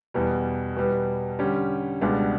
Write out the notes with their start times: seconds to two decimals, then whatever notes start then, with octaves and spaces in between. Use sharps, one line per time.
0.14 E2 B2 G3
0.76 B2 G3 B3
1.39 D3 G3 C#4 G4
2.01 C#2 B2 G3 B3 D4